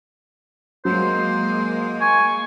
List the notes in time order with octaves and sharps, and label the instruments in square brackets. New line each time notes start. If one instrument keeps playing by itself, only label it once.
[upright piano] F#3 [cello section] G#3 A#3 [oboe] C5
[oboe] G#5 [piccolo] C#6